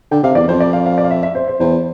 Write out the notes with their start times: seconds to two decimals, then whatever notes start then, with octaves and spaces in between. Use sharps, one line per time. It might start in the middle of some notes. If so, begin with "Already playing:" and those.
0.11 D3 G5
0.23 C3 F5
0.35 E2 D5
0.48 F2 C5
0.60 D5
0.73 F5
0.86 F5
0.98 D5
1.04 F5
1.10 E5
1.23 E5
1.35 C5
1.48 C5
1.60 E2 C5